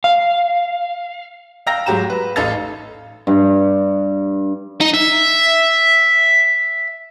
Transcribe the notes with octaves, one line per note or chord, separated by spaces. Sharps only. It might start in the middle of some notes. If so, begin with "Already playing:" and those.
F5
F5 G5 A#5 E6 A#6
G#2 F#3 G4 A#5 E7
B4
A1 D#4 A4 F5 A6
G2
D#4
E5